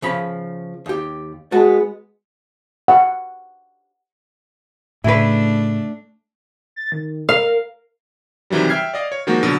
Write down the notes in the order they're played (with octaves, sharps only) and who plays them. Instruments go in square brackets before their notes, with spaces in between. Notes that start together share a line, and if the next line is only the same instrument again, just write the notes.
[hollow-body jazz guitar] C#3 F3 B5
D#2 G4
[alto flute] G#3 [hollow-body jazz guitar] B3 F#4 A5
[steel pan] F#5
[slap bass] A2 C#3 [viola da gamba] A3 D4 [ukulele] E4 B4
[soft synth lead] A6
D#3
[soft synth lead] A#4 [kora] F5
[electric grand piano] C3 D#3 E3 F#3 G3
E5 G5 F6 G#6 C7
D5 D#5 F5
C#5
D#3 F3 G#3 A#3 F#4
B2 D3 F#3